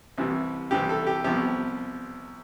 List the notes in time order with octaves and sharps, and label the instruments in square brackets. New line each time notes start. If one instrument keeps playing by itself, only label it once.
[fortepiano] C2 C3 E3
C2 C3 E3 G4
A4
G4
C2 C3 F3 B3 G4